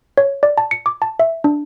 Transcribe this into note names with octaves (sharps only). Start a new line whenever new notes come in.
C#5
D5
A5
C#7
D6
A5
E5
D4